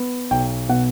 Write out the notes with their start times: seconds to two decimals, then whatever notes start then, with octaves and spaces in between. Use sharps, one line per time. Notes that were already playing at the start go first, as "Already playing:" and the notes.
Already playing: B3
0.31 B1 G5
0.69 B2 F#5